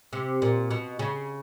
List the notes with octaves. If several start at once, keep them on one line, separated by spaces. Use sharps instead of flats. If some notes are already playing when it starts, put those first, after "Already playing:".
C3
A#2
B2
C#3